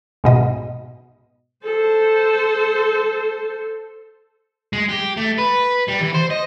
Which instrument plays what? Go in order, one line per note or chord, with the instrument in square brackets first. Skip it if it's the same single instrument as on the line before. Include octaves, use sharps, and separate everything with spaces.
[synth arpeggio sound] G#2 B2 D#5
[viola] A4 C5
[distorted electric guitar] G#3
G4
A3
B4
G3
E3
C5
D#5